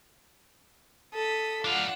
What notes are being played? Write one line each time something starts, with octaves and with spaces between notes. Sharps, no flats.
A4 D#6 B6
D4 F4 F5 F#5